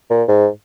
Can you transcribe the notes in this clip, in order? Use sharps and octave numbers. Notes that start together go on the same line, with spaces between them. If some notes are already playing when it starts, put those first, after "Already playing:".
A#2
G#2